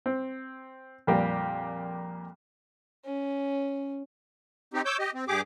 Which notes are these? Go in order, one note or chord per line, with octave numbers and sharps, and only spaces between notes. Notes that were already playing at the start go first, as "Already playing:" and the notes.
C4
F2 A#2 G3 A#3 G4
C#4
C4 D#4 G4
C#5 D6 E6 G6
G4 D#5
C4
G2 G4 G#4 D6